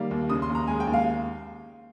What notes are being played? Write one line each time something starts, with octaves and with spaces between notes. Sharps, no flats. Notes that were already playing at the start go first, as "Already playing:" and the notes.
Already playing: D#3 G3 A#3 F5
D#2
C#3 D#6
C6
D#2
A#5
G#3 G#5
G5
D#2
F5